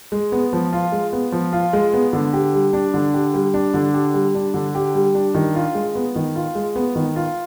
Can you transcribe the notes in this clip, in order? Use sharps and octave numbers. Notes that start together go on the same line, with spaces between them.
G#3
B3
F3
F4
G#3
B3
F3
F4
G#3
B3
D3
G4
G3
D4
D3
G4
G3
D4
D3
G4
G3
D4
D3
G4
G3
D4
D#3
F4
G#3
B3
D#3
F4
G#3
B3
D#3
F4